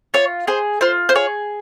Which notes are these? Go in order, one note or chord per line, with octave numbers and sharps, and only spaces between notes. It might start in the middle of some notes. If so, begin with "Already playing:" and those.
F4 C#5
G#4 C5
F4 C5
C5
G#4 C#5